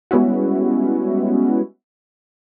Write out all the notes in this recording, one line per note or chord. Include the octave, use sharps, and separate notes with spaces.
G3 G#3 B3 C#4 E4 F#4